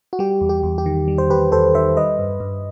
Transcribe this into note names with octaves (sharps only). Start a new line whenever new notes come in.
F#4
G3 G4
E2
G4
E2
G4
D#3
G3
C5
E2 G4 B4
E2 A4 C5
D#3 C5 E5
G3 B4 D#5
G2
G2